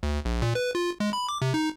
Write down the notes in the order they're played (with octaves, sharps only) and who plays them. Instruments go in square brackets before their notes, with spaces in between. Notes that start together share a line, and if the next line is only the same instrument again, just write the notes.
[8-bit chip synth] D2
A#1
A#2
B4
F4
G#3
B5
D6
C3
D#4